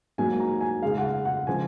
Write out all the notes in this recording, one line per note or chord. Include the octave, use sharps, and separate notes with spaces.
G#2 F#3 A#3 G#5
A#5
G#5
C#2 C#3 G#3 F5
F#5
F5
F#5
C#3 F3 G#3 G#5